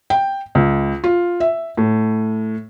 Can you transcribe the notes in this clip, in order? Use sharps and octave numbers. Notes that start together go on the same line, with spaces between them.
G5
C#2
F4
E5
A2